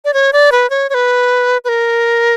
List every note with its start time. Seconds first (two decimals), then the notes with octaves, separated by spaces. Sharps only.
0.05 D5
0.14 C#5
0.33 D5
0.52 B4
0.70 C#5
0.90 C#5
0.94 B4
1.64 B4
1.69 A#4